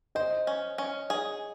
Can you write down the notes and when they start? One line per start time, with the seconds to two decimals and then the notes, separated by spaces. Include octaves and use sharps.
0.15 C5 D#5
0.47 C#4
0.78 C#4
1.10 G#4